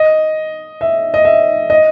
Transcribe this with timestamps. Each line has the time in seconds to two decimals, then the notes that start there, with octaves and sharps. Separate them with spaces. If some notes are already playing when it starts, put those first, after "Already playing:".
Already playing: D#5
0.81 E5
1.14 D#5
1.25 E5
1.70 D#5